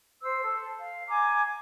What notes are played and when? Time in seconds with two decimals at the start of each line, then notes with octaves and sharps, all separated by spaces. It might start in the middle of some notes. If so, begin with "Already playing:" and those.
0.20 C5 E6
0.42 A4
0.78 F5
1.07 G#5 A#5 D6